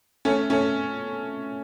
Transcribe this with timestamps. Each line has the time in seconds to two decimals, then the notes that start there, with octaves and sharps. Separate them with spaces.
0.25 A3 C#4
0.50 A3 C#4